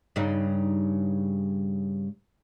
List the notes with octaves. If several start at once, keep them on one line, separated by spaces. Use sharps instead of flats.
G2 C#3 D#4